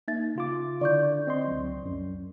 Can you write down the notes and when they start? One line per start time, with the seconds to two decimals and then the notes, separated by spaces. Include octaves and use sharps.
0.08 A#3 D#4 E5 A6
0.36 C#3 F4 D6
0.81 D3 E4 D5 C#6 G6
1.27 C4 D#5 C6
1.47 C#2 F#3
1.83 C2 F#2